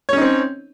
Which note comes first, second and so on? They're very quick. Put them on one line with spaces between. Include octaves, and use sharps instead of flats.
C#5 C#4 D#4 C4